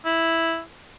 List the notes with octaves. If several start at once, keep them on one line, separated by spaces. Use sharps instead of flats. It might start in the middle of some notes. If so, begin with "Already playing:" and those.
E4